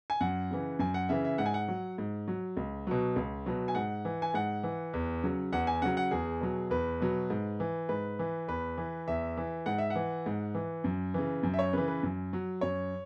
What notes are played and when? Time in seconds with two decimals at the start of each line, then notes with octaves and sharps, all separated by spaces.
0.10 G#5
0.21 F#2 F#5
0.51 C#3 E3
0.79 F#2 G#5
0.94 F#5
1.09 C#3 E3 E5
1.25 E5
1.38 G#2 F#5
1.46 G#5
1.54 F#5
1.68 F#3
1.98 G#2
2.28 F#3
2.57 C#2
2.87 B2 F#3
3.16 C#2
3.46 B2 F#3
3.68 G#5
3.75 G#2 F#5
4.05 E3
4.22 G#5
4.34 G#2 F#5
4.63 E3
4.94 E2
5.24 C#3 F#3
5.52 E2 F#5
5.67 G#5
5.82 C#3 F#3 F#5
5.97 F#5
6.11 E2 G#4
6.41 B2 F#3
6.70 E2 B4
7.01 B2 F#3
7.30 G#2
7.60 E3
7.89 G#2 B4
8.19 E3
8.48 E2 B4
8.77 E3
9.07 E2 E5
9.37 E3
9.66 G#2 F#5
9.78 E5
9.90 F#5
9.95 E3
10.26 G#2
10.55 E3
10.84 F#2
11.14 C#3 E3
11.43 F#2
11.54 E5
11.59 C#5
11.73 C#3 E3 B4
11.88 B4
12.03 F#2
12.33 F#3
12.61 F#2 C#5